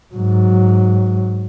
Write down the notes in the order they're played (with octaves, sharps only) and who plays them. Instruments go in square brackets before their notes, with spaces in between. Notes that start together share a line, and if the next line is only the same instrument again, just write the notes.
[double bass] G#2 F#3